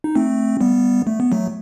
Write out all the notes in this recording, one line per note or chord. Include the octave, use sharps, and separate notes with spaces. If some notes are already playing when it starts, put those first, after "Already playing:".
D#4
A3 C4
G3 B3
A3
B3
F#3 A3